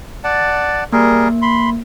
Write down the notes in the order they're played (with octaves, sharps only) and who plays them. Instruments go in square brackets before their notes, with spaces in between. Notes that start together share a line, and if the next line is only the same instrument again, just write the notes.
[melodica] D5 F#5 A5
[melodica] G3 G#4 A#4 [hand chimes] A#3
[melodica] B5 C6